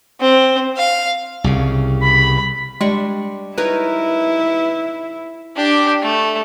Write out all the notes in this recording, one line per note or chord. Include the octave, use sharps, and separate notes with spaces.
C4
F5
C2 C#3
B5
G3 G#3 D4 C#6
D#4 E4 A#4 B4 C#5
D4 G4
A3